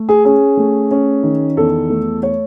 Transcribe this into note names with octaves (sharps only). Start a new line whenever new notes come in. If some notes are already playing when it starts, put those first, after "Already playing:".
Already playing: A3
G#4
C#4 G#4
A3
C#4
D#3
E2 A4
A3
C#5